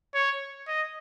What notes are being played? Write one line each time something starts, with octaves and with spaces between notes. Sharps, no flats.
C#5
D#5